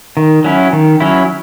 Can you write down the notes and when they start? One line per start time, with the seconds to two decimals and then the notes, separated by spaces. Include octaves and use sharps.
0.17 D#3
0.44 F#3 C#4 E4
0.73 D#3
1.00 F#3 C#4 E4